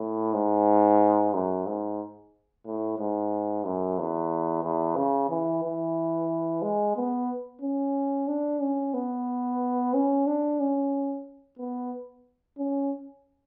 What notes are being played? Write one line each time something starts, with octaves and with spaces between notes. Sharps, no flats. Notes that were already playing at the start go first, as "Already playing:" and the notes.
Already playing: A2
G#2
F#2
G#2
A2
G#2
F#2
E2
E2
C#3
E3
E3
G#3
B3
C#4
D4
C#4
B3
C#4
D4
C#4
B3
C#4